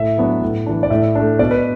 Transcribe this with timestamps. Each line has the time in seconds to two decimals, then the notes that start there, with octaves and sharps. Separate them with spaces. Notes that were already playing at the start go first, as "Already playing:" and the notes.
Already playing: A2 E5
0.18 F#3 B3 D4
0.41 A2
0.66 E3 D4
0.83 D5
0.90 A2 E5
1.15 A3 D4
1.39 B2 D5
1.51 B4